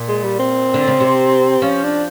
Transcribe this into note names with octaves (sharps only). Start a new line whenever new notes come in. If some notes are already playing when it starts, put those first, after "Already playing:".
Already playing: A#2
G#3
G3
C4
D3
C#3
C3
F3 C#4
D4